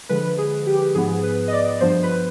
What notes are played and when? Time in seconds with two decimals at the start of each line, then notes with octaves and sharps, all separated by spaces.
0.09 D3 F3 G#3 B4
0.38 G#4
0.67 G4
0.95 G#2 F3 B3 G#4
1.23 B4
1.48 D#5
1.52 D5
1.80 G2 F3 B3 C5
2.03 B4